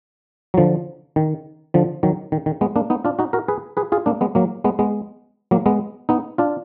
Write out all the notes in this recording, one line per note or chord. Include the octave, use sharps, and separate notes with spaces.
F#3
D3 F3
D#3
D3 F3
D#3 F#3
D#3
D#3
G#3 B3
A#3 D4
B3 D#4
D4 F4
D#4 F#4
F#4 A#4
G#4 B4
G#4 B4
F4 G#4
A#3 D4
G#3 B3
F#3 A#3
G#3 B3
G#3 B3
F#3 A#3
G#3 B3
B3 D#4
D4 F4